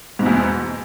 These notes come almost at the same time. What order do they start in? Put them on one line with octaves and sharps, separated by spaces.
G#2 B2 E2